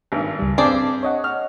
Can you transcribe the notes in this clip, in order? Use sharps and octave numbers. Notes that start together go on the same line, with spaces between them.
G#1 G2
C#2 G3
G2 C4 D4 G#4 D5 A5
C#5 D#5 F#5
F6